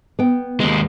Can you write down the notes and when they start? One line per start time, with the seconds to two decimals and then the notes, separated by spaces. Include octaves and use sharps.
0.19 B3 G5
0.60 D#2 G#3